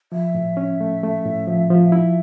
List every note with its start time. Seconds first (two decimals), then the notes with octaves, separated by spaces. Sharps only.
0.12 F3 E5
0.34 A2
0.57 C#4
0.81 A3
1.03 A3
1.25 A2
1.47 F3
1.70 F3
1.92 E4